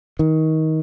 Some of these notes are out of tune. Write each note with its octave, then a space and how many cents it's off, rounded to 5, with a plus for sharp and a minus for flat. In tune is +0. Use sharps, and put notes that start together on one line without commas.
D#3 +25